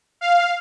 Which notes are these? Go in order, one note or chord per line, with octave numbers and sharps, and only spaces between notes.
F5